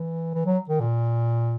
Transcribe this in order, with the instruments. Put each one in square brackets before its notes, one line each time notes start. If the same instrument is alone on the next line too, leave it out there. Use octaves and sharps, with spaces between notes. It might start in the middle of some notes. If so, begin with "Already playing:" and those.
Already playing: [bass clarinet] E3
E3
F#3
D#3
A#2